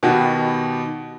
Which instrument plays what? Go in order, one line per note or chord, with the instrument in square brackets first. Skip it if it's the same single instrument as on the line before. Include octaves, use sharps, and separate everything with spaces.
[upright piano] B2 D#3 B3 F#4 G4